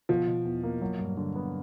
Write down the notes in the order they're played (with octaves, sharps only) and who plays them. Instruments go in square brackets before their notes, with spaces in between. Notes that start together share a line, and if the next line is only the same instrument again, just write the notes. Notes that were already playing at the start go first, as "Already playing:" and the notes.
[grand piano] B2 [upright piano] F3
[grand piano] B2
E2
A#3
F#3
G2
D3
B3